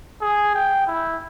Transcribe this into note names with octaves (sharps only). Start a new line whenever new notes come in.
G#4
G5
E4